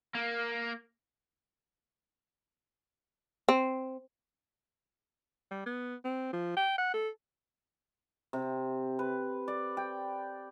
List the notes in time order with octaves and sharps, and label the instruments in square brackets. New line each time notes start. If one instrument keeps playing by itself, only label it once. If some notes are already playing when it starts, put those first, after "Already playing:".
[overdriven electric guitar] A#3
[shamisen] C4
[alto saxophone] G3
B3
C4
F3
G5
F#5
A4
[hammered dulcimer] C3
B4
D5
G5